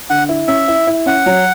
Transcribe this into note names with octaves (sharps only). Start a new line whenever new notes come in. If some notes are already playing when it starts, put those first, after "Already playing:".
D3 F#5
E4
C#4 E5
E4
E4
C#4 F#5
F#3